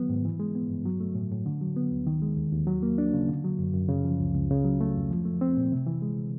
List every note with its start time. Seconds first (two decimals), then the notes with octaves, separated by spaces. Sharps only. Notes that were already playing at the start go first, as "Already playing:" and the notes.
Already playing: D#3 F#3 B3
0.09 G#2
0.25 E3
0.40 G#3
0.55 B3
0.70 G2
0.85 F#3
1.00 A3
1.15 A2
1.31 A2
1.46 D3
1.61 F#3
1.76 B3
1.92 D2
2.07 D#3
2.22 G#3
2.37 D#2
2.52 D#2
2.67 F#3
2.83 A#3
2.98 D4
3.14 C#3
3.28 D3
3.44 F#3
3.59 F#2
3.74 F#2
3.89 C#3
4.05 F3
4.20 C#2
4.35 C#2
4.50 C#3
4.65 F#3
4.81 A3
4.96 F2
5.11 F3
5.25 A3
5.41 C4
5.57 A#2
5.72 C3
5.87 E3
6.02 G#3